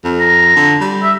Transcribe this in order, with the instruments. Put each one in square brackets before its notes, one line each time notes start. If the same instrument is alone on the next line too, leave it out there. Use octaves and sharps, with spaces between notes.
[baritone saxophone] F2
[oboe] A#5
[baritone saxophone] D3
G3
[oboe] E5